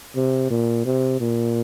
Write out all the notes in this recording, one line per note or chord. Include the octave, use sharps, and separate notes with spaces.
C3
A#2
C3
A#2